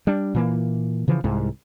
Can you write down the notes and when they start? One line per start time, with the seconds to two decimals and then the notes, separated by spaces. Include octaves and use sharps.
0.07 G3 D4
0.35 A#2 E3 A#3
1.08 C#3 E3 F3
1.24 C2 G#2